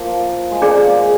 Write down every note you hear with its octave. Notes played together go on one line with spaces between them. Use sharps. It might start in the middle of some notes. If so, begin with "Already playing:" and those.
Already playing: F3 A#3
G#3
A#3 D4 G#4 D5
G#3